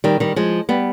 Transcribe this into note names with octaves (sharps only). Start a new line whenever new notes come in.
D#3 G3
D#3 G3
F3 G#3
G3 B3